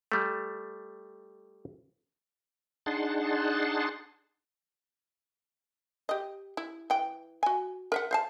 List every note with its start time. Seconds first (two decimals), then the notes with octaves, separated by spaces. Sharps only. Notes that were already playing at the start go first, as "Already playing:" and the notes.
0.12 G3 A3
2.86 D4 D#4 G#4 F#5 A5 C6
6.09 G4 D#5
6.57 E4
6.90 E3 G5
7.43 F#4 G#5
7.92 A#4 E5 F#5
8.11 C5 F5 A5